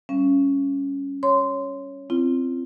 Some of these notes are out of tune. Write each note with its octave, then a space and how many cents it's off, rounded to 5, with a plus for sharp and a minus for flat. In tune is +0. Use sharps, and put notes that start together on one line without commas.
G3 +0 C#4 +0 F5 -40
C#5 +0 C6 -15
C4 +0 F4 -35